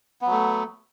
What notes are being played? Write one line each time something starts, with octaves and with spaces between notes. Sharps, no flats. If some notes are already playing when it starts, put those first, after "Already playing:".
F#3 A3 B3